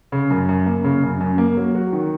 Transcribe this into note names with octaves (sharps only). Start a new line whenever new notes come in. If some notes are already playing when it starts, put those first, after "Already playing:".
C#3
F#2
F#2
A#3
C#3
F#2
F#2
A#3
F#3
F#4
D#3